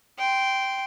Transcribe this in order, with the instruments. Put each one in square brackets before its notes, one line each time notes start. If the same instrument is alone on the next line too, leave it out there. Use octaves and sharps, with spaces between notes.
[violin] G5 C6